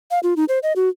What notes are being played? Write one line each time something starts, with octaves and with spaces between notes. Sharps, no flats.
F5
F4
D#4
C5
D#5
F#4